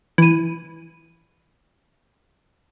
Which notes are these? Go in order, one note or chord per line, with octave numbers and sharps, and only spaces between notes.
E3 D#7